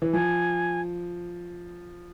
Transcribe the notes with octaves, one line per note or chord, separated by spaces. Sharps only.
E3
F3 G#5